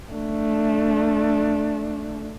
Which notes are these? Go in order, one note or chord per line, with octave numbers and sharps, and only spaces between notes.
A3 D4